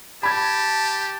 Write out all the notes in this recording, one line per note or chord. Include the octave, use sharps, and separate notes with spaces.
G4 A5 B5 G#6